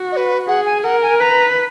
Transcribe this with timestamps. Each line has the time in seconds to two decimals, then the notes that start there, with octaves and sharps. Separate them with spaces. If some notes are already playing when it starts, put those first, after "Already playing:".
Already playing: F#4
0.12 D#5
0.17 B4
0.48 G#4 F#5
0.66 G#5
0.84 A#4 F#5
1.02 G#5
1.20 B4 A#5